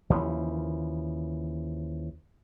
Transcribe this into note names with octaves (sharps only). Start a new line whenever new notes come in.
D#2 C#3 E3 F3